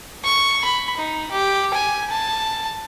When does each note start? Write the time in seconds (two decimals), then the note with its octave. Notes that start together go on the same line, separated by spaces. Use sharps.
0.24 C#6
0.64 B5
0.97 D#4
1.31 G4
1.74 G#5
2.10 A5